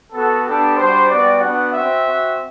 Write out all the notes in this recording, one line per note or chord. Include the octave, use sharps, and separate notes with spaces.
B3 F#4 A4
B3 D4 G4 A4
G3 D4 F#4 C5
G3 B3 F#4 D5
B3 D4 F#4 F#5
C4 F#4 E5
C4 F#4